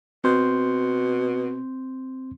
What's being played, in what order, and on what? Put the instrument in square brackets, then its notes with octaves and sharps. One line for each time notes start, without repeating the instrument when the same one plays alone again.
[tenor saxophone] B2 [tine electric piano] C4 C6 G6